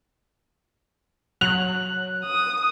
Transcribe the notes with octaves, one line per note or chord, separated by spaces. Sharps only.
F#3 F#6 F7
D#6